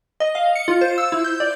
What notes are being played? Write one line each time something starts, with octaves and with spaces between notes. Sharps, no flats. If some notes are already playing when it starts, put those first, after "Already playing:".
D#5
F5
C#7
F4
C5
E6
E4
G6
D5